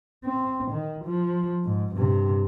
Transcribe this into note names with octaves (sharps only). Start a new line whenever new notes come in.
C4
D#3
F3
G#2
G2 C3